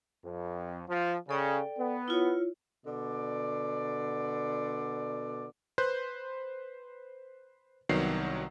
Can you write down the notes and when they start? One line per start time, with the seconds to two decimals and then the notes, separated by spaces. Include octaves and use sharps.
0.24 F2
0.89 F3
1.29 C#3 A4 D5 G5
1.79 B3
2.08 E4 F4 C#5
2.86 B2 D3 D5
5.78 B4 C5 C6 F#6 G6
7.89 C2 D#3 F#3 B3 C7